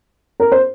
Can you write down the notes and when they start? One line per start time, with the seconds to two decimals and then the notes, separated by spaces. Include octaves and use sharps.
0.40 A#4
0.52 C5